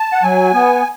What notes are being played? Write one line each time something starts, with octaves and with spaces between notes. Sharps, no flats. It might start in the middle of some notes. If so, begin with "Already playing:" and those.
Already playing: A5
F#5
F#3 G#5
B3